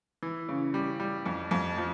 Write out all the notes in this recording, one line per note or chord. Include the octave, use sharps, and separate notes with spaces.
E3
C#3
G3
G3
F2
F2
F3